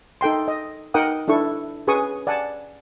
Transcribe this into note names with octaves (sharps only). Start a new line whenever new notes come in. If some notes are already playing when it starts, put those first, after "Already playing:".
D#4 A4 G5 C6
D#5
D#4 A#4 F#5 G5 D#6
D4 E4 A4 C#6
C#4 G#4 B4 G#5 C#6 D#6
D5 F#5 G#5 A5